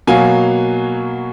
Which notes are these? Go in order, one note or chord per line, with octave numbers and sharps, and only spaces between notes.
B2 F#3 A#3 F5 G#5